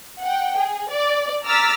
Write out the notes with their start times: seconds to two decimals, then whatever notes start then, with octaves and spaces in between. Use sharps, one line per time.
0.21 F#5 G5
0.57 G#4
0.89 D5
1.45 A#5 D6 E6 F6 A6 B6